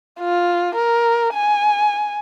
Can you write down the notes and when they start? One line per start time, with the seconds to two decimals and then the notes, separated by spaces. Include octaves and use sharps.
0.20 F4
0.75 A#4
1.34 G#5